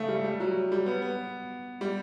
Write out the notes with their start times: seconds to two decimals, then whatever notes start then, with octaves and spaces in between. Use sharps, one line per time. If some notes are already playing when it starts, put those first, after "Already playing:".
Already playing: C#3 A3
0.08 G3
0.24 G3
0.40 F#3
0.72 G3
0.86 B3
1.02 B3
1.81 G3